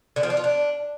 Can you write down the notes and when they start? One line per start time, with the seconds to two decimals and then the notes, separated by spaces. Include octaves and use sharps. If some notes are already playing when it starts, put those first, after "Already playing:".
0.16 D3
0.23 F3
0.30 D4
0.37 F4
0.44 D4